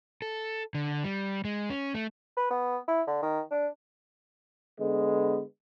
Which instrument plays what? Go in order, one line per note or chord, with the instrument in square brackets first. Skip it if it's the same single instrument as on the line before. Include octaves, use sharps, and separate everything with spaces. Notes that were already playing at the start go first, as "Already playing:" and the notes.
[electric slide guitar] A4
D3
G3
G#3
C#4
A3
[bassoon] B4
B3
E4
D3
D#3
D4
[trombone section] D3 G#3 B3